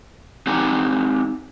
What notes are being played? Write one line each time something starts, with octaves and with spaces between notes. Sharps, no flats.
C4 D#4 G4 F#5 G#5 A#5